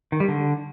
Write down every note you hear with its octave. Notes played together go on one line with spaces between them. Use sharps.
D#3
G3
D3